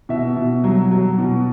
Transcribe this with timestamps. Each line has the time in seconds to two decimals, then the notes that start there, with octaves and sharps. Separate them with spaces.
0.09 B2 E5
0.37 B2
0.64 F#3
0.91 F#3
1.18 B2